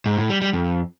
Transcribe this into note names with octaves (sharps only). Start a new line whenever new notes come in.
G#2
A2
G3
G3
F2